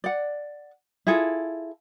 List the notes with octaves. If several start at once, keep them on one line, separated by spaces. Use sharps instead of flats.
D5 F#5
E4 F4 G#4 A4